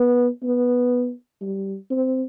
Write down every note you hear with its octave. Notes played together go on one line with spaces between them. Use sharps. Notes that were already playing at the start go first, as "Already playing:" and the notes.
Already playing: B3
B3
G3
C4